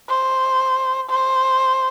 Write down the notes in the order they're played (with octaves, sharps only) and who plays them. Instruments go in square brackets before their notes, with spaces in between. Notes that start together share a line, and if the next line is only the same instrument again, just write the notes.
[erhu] C5
C5